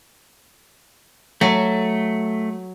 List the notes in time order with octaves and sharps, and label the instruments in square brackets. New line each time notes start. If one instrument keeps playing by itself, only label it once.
[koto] F#3 [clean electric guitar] A3